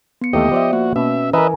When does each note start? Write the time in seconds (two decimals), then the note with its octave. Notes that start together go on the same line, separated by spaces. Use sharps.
0.21 B3 C#7
0.33 D#2 E3 A3 G4 D#5
0.52 F3 D5 E5
0.73 A#3 F#4
0.96 B2 C#4 E5
1.33 E3 A#4 B4 D#5 E5 G#5 A#5